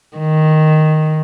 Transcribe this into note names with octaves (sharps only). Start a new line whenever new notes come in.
D#3